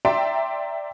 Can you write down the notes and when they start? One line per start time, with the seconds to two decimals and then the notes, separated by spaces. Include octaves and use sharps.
0.05 D5 E5 G5 A#5 C6